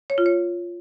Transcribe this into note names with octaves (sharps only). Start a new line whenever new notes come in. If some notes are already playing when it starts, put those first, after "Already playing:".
C#5
F4
C#5